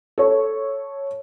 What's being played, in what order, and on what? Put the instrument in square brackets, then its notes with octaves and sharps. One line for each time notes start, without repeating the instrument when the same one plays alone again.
[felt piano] A4 C#5